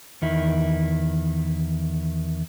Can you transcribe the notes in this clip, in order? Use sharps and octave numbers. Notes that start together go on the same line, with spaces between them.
E2 D#3 E4